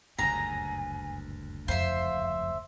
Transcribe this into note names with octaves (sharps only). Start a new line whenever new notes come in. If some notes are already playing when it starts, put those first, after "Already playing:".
F#1 D2 G2 A#2 G#5 A#5
F2 C5 E5 F5